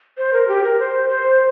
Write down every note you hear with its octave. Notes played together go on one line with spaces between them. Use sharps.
C5
A#4
G4
A#4
C5
C5